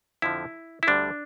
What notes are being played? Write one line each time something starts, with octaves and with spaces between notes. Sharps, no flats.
F2 D3 F3 E4
E4
D2 D3 G3 D4